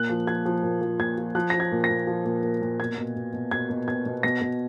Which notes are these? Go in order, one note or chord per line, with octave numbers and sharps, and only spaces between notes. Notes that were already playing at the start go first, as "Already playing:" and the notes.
Already playing: A#2 F#6
F3
F3 G#6
F3
A#2
F3
A#2 G#6
F3
F3 F#6
F3 A#6
G#6
A#2
A#6
A#2
F3
A#2
A#2
A#2
B2 G#6
B2
B2
B2
B2 G#6
B2
B2 G#6
B2
B2 A#6
B2